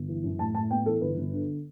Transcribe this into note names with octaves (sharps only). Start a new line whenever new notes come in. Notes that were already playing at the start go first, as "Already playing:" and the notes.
Already playing: G1
E3
F#2
A2 A5
A2 A5
B3 G5
E3 A4
G1 B4
G1
D3